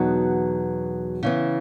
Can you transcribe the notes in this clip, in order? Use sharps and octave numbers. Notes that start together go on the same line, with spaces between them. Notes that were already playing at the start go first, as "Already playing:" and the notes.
Already playing: E2 B2 F#3 B3 D#4
C#3 E3 B3